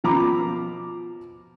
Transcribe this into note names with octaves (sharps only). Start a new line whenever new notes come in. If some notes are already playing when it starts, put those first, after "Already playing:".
B2 F3 A#5 B5 D6